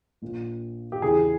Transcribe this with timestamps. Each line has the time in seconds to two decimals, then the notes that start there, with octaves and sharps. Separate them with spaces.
0.22 A#1 A#2 F3
0.92 G4
1.02 E2 C#3 E3 G#4